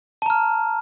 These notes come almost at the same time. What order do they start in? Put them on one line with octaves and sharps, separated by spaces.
A5 A#5 F6